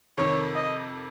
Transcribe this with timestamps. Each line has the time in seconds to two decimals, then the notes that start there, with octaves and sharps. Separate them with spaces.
0.18 F2 C3 D#3 C#5
0.55 D#5